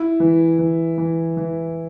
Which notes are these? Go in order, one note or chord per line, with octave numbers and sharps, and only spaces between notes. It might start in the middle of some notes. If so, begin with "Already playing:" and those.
Already playing: E4
E3
E3
E3
E3